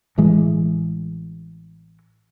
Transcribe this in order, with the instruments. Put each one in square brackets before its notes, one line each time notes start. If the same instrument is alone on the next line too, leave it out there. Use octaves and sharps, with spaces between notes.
[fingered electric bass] A1 A2 E3 G#3